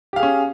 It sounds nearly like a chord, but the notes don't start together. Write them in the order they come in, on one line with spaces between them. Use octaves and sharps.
G4 F5 G#4 C#4